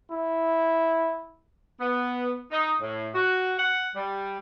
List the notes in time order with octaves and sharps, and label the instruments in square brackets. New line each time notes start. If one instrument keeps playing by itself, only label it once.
[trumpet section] E4
[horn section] B3
D#4
A2
F#4
F#5
G3